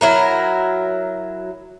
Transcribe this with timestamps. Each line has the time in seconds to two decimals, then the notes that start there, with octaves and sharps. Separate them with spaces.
0.01 F#3 E4 A#4